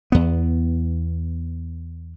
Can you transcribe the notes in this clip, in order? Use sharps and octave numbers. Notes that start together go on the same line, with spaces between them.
E2 B3